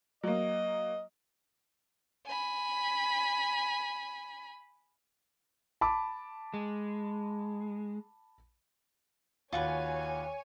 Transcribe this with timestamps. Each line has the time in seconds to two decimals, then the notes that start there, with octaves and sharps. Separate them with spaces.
0.23 F#3 A#3 D#5
2.27 G#5 B5
5.81 A5 B5 D6
6.54 G#3
9.53 D#2 F4 F#4 B4 C#5 G#5